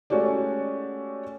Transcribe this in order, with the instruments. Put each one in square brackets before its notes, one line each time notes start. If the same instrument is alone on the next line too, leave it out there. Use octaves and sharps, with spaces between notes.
[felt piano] G#3 A3 C#4 F#4 G4 D5